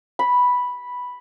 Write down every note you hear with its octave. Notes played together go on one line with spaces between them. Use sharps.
B5